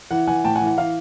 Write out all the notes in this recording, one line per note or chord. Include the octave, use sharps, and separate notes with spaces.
E3 F#5
E3 F#5 G#5
A2 G5 A5
F#5 G#5
E3
F#5
E3 F5